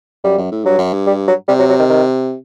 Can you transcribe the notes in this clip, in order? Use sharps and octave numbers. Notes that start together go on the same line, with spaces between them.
F#2 G3
F#2
A2
G2 F#3
F#2
G2
G3
F#3
C3 G3
F#3
F#3
D#3
D#3